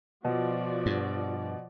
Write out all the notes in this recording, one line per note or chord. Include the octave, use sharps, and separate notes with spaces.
B2 F3 F#4 D5
G2